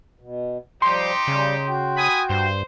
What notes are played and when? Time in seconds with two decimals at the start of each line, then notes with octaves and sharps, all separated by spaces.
0.20 B2
0.82 F3 G3 D#4 G4 C6
1.28 C#3 G3
1.67 F#4 G5
1.97 G#5 B5 D#6
2.30 G2 C5